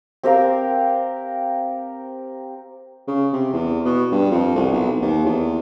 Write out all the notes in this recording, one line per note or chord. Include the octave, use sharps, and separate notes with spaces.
C4 G4 A#4 F5
C#3
C3
E2
B2
G2
F2
C2
B1
D#2
E2